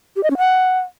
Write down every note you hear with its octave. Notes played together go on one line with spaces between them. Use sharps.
G4
D#5
C#4
F#5